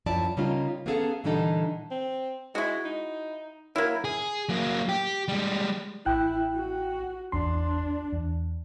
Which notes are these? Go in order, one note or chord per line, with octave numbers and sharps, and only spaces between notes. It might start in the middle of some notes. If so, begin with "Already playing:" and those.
F#2 F3 E4 D5 A5
C#3 G3 A#3 D#4 F4
A#3 B3 C#4 G#4 A4 F5
A#2 D3 E3 G3 D#4 A4
C4
G#3 E4 F#4
D#4
F#3 A#3 E4
G#4
F#3 A#3
G4
G3 G#3
A1 E4 G5 F#6
F#4
G#1 E2 D4 C6
E2